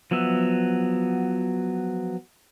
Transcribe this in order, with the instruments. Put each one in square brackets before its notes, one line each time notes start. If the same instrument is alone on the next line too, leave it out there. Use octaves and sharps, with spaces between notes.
[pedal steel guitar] F3 F#3 B3 E5